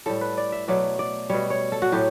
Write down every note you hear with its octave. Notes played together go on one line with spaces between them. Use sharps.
A2 G3 A4
B4
D5
E5
B2 F#3 A3 D5
D5
B2 G3 C#5
C#5
A4
F#4
A2 F#3 A3 G4